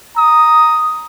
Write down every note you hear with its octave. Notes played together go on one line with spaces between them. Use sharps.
A#5 D#6